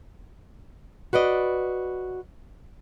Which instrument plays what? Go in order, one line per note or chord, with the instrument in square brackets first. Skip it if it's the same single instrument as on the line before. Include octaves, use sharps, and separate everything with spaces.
[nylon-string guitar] F#4 B4 D5 D#5